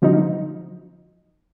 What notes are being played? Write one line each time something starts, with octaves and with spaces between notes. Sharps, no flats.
D3 F3 F#3 D#4